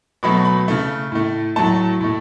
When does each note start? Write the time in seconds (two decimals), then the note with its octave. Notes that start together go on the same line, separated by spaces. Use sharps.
0.23 B2 F#3 A3 B5
0.45 B5
0.68 C#3 A3
1.12 A2 A3
1.56 A2 F#3 A3 A5
2.01 A2 A3